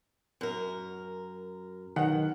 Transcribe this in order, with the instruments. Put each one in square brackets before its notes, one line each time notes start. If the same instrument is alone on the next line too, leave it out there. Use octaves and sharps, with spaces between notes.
[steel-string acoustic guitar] F#2 A#4
[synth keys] B1 D#3 [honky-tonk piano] F#5